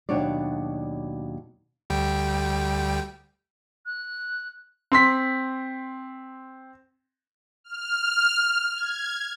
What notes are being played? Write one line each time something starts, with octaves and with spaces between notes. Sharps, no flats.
D#2 B2 F#3 D4 C#5 D5
D2 G3 G5
F#6
C4 C6 B6
F6
G#6